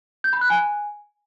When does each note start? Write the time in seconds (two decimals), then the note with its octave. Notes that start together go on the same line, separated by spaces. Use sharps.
0.24 G6
0.33 B5
0.41 F#6
0.50 G#5